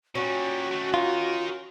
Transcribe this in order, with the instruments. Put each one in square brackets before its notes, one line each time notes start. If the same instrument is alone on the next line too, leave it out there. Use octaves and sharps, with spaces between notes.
[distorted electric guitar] A#2 G3 [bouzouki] C#4 [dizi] F#4
[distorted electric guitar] D#3 A3
[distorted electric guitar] D#4 A#4 [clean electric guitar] F4